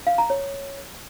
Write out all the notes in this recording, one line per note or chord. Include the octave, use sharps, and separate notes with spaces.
F5
A#5
C#5